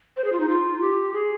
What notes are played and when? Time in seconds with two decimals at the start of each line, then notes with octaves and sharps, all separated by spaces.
0.17 C5
0.24 G#4
0.32 F4
0.40 D#4
0.49 F4
0.81 G4
1.14 G#4